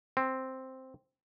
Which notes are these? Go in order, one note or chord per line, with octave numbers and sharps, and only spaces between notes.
C4